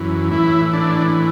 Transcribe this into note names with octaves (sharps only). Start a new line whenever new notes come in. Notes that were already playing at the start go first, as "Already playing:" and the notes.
Already playing: F#2 E3
A2 E3 E4
D4